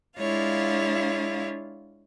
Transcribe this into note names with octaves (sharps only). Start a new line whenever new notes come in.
G#3 D4 E4 F4 C#5 F5